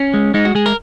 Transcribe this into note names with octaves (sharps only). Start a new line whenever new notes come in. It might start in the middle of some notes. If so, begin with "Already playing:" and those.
Already playing: C#4
G#3
G#3 D#4
F#4
G#3 G#4
A#4